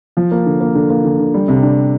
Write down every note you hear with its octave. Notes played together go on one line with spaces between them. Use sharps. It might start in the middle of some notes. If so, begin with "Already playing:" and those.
F3
A#3
D3
A#3
D3
A#3
D3
D3
G3
C3
D4